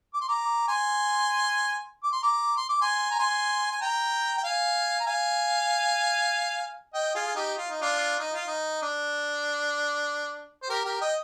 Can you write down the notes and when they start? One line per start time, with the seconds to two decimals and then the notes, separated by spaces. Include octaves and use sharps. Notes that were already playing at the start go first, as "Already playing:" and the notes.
0.14 D6
0.21 C6
0.28 A#5 D6
0.68 G#5 C6
2.04 D6
2.12 C6
2.22 A#5 D6
2.57 C6
2.69 D6
2.81 G#5 C6
3.11 A#5
3.19 G#5 C6
3.72 G#5
3.81 G5 A#5
4.38 G5
4.43 F5 G#5
5.00 A#5
5.06 F5 G#5
6.94 D#5 G5
7.15 F4 G#4
7.27 G#4
7.35 D#4 G4
7.57 F4
7.69 D#4
7.81 D4 F4
8.19 D#4
8.34 F4
8.47 D#4
8.82 D4
10.63 C5
10.70 G4 A#4
10.85 G4 A#4
11.01 D#5 G5